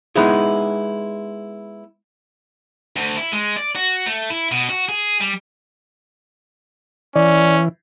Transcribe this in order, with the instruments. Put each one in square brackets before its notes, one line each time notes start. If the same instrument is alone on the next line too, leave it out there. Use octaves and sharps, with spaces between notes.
[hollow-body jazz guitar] G#3 B3 D#4 E4 G#4
[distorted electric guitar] D2
E4
G#3
D5
F#4
A3
E4
B2
F#4
G#4
G3
[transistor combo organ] E3 [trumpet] C#4 [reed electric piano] D5